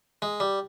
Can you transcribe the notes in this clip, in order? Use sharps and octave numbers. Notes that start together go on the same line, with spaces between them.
G#3
G3